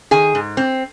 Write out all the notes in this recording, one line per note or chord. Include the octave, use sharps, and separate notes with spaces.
D#3 G#4 G#5
G#2
C4